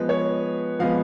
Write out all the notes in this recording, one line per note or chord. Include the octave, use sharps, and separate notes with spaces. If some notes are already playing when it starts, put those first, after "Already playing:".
Already playing: F3 G#3 B3 B4
C#5
F3 G#3 B3 F5